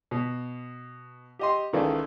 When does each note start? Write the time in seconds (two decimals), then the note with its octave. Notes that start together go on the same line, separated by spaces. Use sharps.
0.11 B2
1.39 G4 D#5 C6
1.73 C#2 D#3 E3 A4 D5